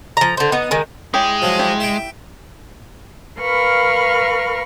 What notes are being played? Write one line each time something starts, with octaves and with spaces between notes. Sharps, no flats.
F3 A#5
D3 C5
B3 D#4
D#3 G#3
G#3 E4 G4 C#5
F3 F#3
E4 G4 D5
E5 G5
A#4 B4 F5 B5 C#6 F6